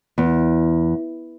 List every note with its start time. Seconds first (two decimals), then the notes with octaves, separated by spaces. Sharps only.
0.18 E2